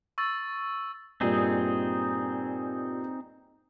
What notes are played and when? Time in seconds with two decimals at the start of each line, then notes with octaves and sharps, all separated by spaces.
0.18 C#6 E6 A6
1.21 G2 A#2 C4 D#4 G#4